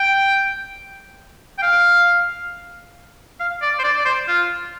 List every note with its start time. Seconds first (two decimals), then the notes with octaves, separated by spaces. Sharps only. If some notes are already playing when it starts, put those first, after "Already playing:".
Already playing: G5
1.58 G5
1.63 F5
3.40 F5
3.62 D5
3.79 C5
3.84 D5
3.99 D5
4.05 C5
4.28 F4